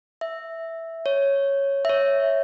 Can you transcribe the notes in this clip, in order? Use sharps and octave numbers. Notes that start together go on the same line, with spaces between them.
E5
C#5
E5
C#5